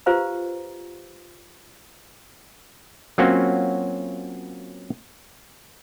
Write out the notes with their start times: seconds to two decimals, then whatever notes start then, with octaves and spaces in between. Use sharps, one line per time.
0.06 F4 G4 B4 C5 F5 A#5
3.18 F#3 A#3 C4 C#4 F4 F#4